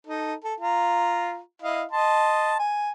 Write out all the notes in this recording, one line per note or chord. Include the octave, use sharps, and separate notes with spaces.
D#4 A4
A4
F4 A#5
E4 D#5 F5
D#5 A5 C6
G#5